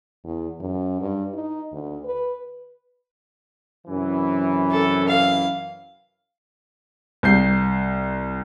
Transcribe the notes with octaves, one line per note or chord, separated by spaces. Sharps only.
E2
F#2
G2
D#4
D2
B4
F#2 C3 E3
A4
F5
C2 G6 C7